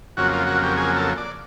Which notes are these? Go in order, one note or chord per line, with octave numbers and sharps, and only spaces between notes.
F2 C#3 F#3 A#3 F#4
F4
F#4
G4
G#4
A4
D5